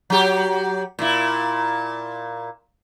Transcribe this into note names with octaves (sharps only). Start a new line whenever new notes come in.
F#3 G4
A#2 E4